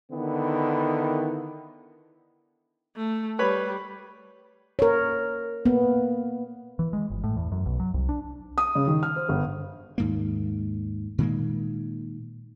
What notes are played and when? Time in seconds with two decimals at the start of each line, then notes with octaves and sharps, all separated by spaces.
0.12 D3 D#3 B3 E4
2.96 A3
3.39 G3 B4 C#5 B5
4.79 A#4 C#5
5.65 A#3 B3
6.79 E3
6.93 G#3
7.10 G1
7.24 A2
7.37 E2
7.52 F#2
7.66 B1
7.80 F#3
7.94 C2
8.09 D4
8.58 D#6
8.75 C#3
8.87 D#3
9.03 F6
9.16 C5
9.29 G1
9.98 D#2 G#2 A#3
11.18 A#2 D#3 G#3 A#3